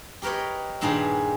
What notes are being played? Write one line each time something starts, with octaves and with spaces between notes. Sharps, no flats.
G4 A#4 B4 C#5 D#5
G2 A#2 D#3 D#4 G#4 B4